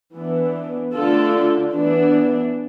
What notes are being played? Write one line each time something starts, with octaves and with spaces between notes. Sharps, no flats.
E3 B3 D4
D3 A3 D4 F4 A4
E3 B3 D4